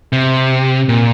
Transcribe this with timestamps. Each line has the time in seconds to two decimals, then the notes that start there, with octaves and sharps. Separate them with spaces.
0.13 C3
0.89 A#2